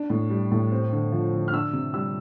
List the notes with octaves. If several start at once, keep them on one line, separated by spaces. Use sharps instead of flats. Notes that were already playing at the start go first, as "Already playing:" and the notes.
Already playing: D4
A2
G3
A2
C4
D3
F3
D3
F6
D4 E6
C3
G3 E6